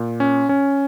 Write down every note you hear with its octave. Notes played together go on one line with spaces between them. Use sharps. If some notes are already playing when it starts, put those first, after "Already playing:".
Already playing: A#2
C#4
C#4